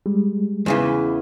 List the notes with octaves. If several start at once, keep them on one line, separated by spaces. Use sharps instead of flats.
G3 G#3
E2 C#3 E3